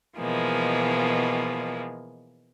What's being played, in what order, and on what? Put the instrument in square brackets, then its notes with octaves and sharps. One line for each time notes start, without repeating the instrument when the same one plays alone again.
[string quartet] B2 E3 F3 G#3 A#3